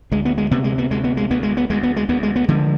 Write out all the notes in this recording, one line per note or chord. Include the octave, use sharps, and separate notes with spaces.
D2 G#3
B3
G#3
C3 B3
G#3
B3
D2 G#3
B3
G#3
D2 B3
G#3
B3
D2 G#3
B3
G#3
D2 B3
G#3
B3
D3 F3 G#3